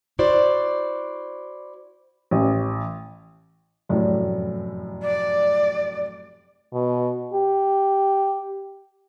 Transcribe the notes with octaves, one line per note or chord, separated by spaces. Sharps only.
E4 F#4 C5 D5
A1
F1 F#2 A2
D5
B2
G4